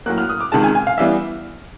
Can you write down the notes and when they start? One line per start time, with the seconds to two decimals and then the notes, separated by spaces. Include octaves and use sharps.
0.06 A2 F#3 A#3 F#6
0.18 F6
0.29 D#6
0.41 D6
0.52 C#2 C3 D#3 G#3 A5
0.64 G#5
0.75 G#5
0.87 F5
0.98 E3 G3 B3 E5